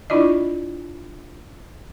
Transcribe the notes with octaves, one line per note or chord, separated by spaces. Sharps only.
D4 E4 F4 D5 D#5